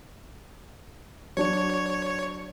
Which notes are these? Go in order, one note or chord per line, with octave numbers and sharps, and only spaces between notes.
F#3 D4 C#5